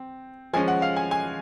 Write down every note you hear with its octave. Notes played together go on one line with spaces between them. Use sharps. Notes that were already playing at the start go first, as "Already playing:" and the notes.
Already playing: C4
F3 G#3 C#4 G#5
F#5
F5
G#5
G#5